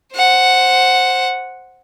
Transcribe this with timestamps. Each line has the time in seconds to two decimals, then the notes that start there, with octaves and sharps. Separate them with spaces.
0.14 C5 F#5